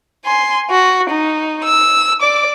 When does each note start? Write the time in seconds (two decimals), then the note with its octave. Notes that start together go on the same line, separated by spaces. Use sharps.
0.25 G#5 C6
0.71 F#4
1.10 D#4
1.64 E6
2.21 D5 D6